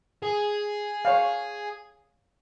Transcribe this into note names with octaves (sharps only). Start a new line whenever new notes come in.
G#4
C#5 F5